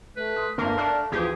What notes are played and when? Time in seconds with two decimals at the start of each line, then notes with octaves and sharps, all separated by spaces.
0.16 A3 B4
0.36 C6 D#6
0.58 G1 D3 A3 A#3 A#4
0.77 D4 F5
1.12 D2 E3 F3 G4 G#4 D#6